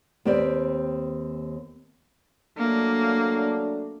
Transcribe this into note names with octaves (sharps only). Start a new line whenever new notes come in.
D#2 C4 G4 B4 D5
F#3 A3 A#3 D4